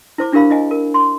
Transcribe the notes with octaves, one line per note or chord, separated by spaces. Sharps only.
E4 C5 D6
D4 E4 G4 A#4 F5 B5
E4 D#5 G#5
A#4
C6